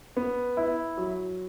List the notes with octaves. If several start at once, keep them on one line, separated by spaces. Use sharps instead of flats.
B3
E4
F#3